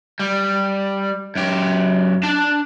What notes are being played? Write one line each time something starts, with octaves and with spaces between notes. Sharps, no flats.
G3
F#2 G4
D4 A5